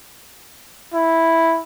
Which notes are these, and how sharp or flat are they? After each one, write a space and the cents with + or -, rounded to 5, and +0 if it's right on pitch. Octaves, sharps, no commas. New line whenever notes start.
E4 -5